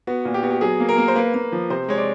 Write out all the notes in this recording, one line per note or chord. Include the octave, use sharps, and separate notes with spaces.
B3 F#4
A#2
G4
B3 F#4
G4
F#3 G#4
A#3
A#4
A#3
C5
A#3 B4
A#3
F3
C3 C5
G#3 C#5
D5